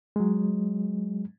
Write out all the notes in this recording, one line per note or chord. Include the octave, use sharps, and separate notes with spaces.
F#3 G#3